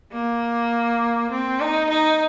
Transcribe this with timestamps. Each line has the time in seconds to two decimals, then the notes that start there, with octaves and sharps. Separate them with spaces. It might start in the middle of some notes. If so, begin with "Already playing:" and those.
0.12 A#3
1.31 C4
1.60 D#4
1.90 D#4